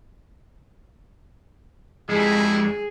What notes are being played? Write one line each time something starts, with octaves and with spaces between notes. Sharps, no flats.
F2 G3 G#3 E4 G#4